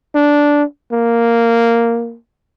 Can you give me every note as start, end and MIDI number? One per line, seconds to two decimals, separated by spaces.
0.14 0.63 62
0.92 2.16 58